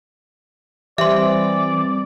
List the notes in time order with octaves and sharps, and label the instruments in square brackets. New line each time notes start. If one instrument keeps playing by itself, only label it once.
[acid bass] E3 [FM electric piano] G3 C4 [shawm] D5 [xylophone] E5 C6